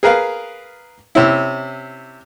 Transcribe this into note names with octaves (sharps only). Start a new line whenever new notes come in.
G#4 A#4 B4 F5
C3 C#4 E4